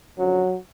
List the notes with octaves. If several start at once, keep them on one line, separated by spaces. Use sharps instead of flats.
F#2 D3 F3 F#3